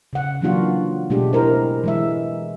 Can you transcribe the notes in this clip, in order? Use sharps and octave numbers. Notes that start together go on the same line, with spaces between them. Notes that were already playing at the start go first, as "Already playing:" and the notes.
C#3 F#5
E3 F#3 A#3 D4 F4 F#4
B2 G#3 A3 D4 G4
E4 A#4 C5
E3 G#3 E5